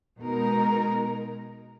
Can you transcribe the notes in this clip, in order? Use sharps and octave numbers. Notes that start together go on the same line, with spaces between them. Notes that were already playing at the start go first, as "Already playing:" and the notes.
B2 G#3 D#4 A#4